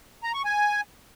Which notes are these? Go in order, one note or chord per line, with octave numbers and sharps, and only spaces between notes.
A#5
C#6
G#5